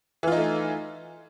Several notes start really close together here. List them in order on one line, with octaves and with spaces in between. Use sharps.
E3 F4 D#4 A3